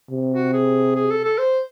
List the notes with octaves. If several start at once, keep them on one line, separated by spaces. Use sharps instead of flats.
C3
F#4
G#4
G#4
A4
A4
C5